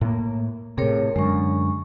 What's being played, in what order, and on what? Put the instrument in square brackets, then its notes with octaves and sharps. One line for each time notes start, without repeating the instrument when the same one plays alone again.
[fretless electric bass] A2 A#3
[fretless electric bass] A2 C3 [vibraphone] G#4 A#4 C#5
[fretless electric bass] F#2 D3 [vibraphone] G#3 C#6